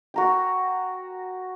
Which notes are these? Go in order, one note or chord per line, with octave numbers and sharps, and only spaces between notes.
F#4 A#4 G5